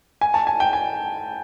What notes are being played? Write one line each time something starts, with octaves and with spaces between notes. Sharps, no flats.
G#5
A5
G#5
G5
G#5